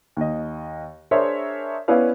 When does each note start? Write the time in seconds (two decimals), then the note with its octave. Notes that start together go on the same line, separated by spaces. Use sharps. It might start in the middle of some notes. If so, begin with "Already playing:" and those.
0.17 D#2 D#5
1.11 D4 G#4 A#4 C5 C#5 E5
1.88 B3 C#4 E4 B4 D5 F5